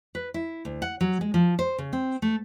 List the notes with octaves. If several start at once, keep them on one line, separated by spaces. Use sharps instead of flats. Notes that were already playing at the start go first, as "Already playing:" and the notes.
B4
E4
D2
F#5
F#3
G#3
F3
C5
C#3
C4
A3